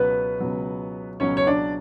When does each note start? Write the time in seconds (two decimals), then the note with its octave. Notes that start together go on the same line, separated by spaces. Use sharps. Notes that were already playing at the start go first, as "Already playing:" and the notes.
Already playing: C#2 B2 F#3 B3 B4
0.40 C#2 B2 F#3
1.20 C#2 B2 F#3 C#4 C#5
1.37 C#5
1.47 D4 D5